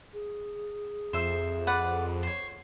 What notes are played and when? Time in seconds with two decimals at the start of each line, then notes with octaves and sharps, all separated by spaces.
0.13 G#4
1.13 F2 C5 E5
1.67 B4 D5 F#5
2.23 C5 C#5